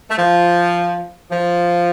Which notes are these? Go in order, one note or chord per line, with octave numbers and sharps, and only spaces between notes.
A3
F3
F3